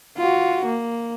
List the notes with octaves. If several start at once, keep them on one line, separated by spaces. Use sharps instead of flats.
F4 F#4
A#3